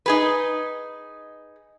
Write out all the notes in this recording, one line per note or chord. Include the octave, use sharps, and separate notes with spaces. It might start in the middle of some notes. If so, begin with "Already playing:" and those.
D#4 G#4 B4